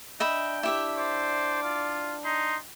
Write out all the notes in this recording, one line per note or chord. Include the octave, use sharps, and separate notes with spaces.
D4 D#5 E5 G5 B5
E4 G4 E5
C5 D5
F4
D#4 C6